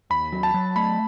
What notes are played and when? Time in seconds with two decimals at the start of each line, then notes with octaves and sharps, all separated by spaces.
0.10 D#2 B5
0.32 F#3
0.43 A5
0.54 F#3
0.76 A3 B5